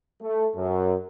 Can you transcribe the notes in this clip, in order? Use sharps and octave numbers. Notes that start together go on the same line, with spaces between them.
A3
F#2